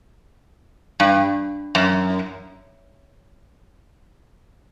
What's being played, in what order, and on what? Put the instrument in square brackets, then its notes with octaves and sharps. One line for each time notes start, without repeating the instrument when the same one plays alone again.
[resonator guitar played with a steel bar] G2
F#2